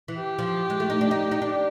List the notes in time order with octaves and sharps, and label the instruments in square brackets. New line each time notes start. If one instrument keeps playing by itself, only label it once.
[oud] E3
[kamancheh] G4
[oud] F3
G#3
A3
D#4
D4
D#4
D#4
D4